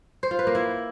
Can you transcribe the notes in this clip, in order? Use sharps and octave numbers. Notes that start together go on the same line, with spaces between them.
C5
F4
B4
A#3
E4